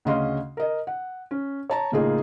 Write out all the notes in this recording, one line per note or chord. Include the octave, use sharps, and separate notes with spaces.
D2 C#3 C#4 D#5 F5 C6
A#4 D#5
F#5
C#4
C#5 A5 A#5
A2 C#3 A#3 D#4 F4 G#4